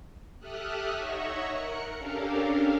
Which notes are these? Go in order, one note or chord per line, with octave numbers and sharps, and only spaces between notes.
G4 A4 E5 D#6 F6 F#6
D#4 C#5 D#5 E5 F#5 C#6
A#4 F#6 C#7
C#4 D4 G4 A4 A#4 F5